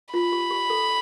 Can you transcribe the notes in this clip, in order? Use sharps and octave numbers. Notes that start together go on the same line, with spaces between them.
F4 B5
G4
G4
A4